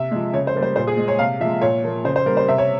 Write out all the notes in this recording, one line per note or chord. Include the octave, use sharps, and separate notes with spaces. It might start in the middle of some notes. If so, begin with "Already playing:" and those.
Already playing: C3 E5
F3 G#3
C#3 C#5
C5
G3 A#3
C5
A#2 C5
G#4
G#3
C#5
C3 F5
F3 E5
G#3
A#2 C#5
F3 A#3
C#3 C5
C5
G3 A#3 A#4
C5
C3 E5
C#5